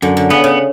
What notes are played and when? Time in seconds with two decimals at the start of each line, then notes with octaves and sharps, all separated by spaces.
0.02 F#2 D3
0.17 D3
0.30 C#3 B3
0.44 C#3